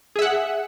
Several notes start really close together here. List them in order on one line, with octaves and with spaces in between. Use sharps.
G#4 E5 F#5